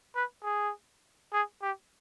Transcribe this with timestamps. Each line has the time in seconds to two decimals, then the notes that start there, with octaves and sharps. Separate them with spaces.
0.16 B4
0.44 G#4
1.33 G#4
1.62 G4